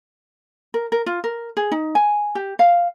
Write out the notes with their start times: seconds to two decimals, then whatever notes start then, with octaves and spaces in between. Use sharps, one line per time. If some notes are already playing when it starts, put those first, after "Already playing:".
0.74 A#4
0.92 A#4
1.06 F4
1.24 A#4
1.57 G#4
1.72 D#4
1.95 G#5
2.35 G4
2.59 F5